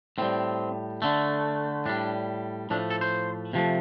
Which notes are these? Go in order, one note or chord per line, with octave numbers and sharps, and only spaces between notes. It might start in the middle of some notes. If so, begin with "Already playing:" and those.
A2 G3 C4
D3 A3
A2 G3 D4
A2 F3 A3 D4
A4
C5
C3 F3 A3